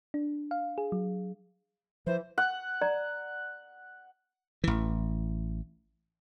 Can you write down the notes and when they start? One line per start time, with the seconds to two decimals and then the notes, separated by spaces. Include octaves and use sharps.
0.14 D4
0.51 F5
0.78 G#4
0.92 F#3
2.07 E3 F3 C5
2.38 F#5
2.81 D5 A#5
4.64 A1 E3